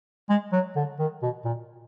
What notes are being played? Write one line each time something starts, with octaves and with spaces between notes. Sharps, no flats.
G#3
F#3
D3
D#3
B2
A#2